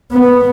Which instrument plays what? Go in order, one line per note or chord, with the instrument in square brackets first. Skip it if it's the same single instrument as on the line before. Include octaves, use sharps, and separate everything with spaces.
[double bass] B3